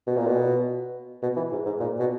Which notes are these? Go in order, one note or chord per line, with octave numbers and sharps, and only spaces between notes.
B2
A#2
B2
B2
E3
G#2
G#2
A#2
B2